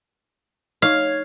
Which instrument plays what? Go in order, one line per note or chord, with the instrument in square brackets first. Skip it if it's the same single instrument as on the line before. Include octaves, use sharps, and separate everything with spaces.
[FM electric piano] D#4 C#5 G#6 [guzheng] F5